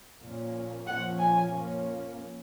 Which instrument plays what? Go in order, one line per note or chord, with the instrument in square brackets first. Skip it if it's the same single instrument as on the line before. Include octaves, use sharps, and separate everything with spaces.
[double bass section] A#2 F3 A#3 C#4
[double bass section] A#2 F3 A#3 C#4 [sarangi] F#5
[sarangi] G#5
[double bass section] F3 A#3 C#4